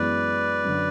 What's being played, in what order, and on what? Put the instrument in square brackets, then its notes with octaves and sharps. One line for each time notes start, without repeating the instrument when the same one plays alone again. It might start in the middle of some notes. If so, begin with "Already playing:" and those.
Already playing: [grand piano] F#2 E3 G#3 B3 [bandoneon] B4 D5
[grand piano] F#2 D3 F#3